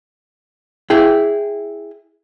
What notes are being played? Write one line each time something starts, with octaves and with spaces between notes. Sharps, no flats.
E4 G#4 G5